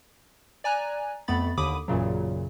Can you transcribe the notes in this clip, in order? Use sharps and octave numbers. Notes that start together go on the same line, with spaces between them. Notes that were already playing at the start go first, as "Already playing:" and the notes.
D5 G#5 A#5 F#6
F2 A3 B3 B5 A6
D#2 D3 B5 D6 D#6 D#7
A1 F#2 A#2 C#3 F#3